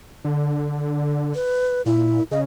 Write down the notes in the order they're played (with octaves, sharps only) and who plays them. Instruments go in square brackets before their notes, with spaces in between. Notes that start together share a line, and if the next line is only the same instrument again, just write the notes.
[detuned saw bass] D3
[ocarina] B4
[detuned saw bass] A#2 [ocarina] E4
[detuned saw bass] C#3 [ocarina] D#5